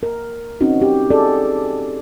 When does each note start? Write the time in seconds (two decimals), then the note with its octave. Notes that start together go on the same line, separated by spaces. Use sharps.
0.03 A#4
0.61 C4 C#4 D#4 F#4
0.81 G4
1.11 G#4 A4 D5